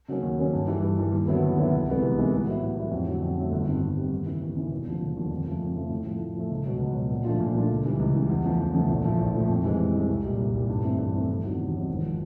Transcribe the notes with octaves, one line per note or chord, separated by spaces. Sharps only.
C#3 F#3 A#3 C#4
D#2
C#3 F#3 A#3 C#4
G2
E3 G3
G2
E3 G3
D#2
D3 F#3 B3 E4
D#2
D3 F#3 B3 E4
C2
C3 E3 G#3 B3
C2
C3 E3 G#3 B3
A2
F#3 B3 E4
A2
F#3 B3 E4
F2
D3 F#3 A3
F2
D3 F#3 A3
G1
G2 D#3 G3 C4
G1
G2 D#3 G3 C4
D#2
C#3 E3
D#2
C#3 E3
E1
D#2 D3 F3
E1
D#2 D3 F3
F2
C#3 F3 A3
F2
C#3 F3 A3
A2
F3 A3
A2
F3 A3
C#2
B2 F#3
C#2
B2 F#3
A#2
F3 A3 D4 F4
A#2
F3 A3 D4 F4
C#2
C#3 E3 G3
C#2
C#3 E3 G3
E2
C#3 F3 A3
E2
C#3 F3 A3
A#1
A2 F3 A3
A#1
A2 F3 A3
F2
C3 E3 G#3 C4
F2
C3 E3 G#3 C4
C2
A#2 G3
C2
A#2 G3
G2
E3 A3 C4
G2
E3 A3 C4
F1
E2 C3 D#3 F#3
F1
E2 C3 D#3 F#3
G#1
F3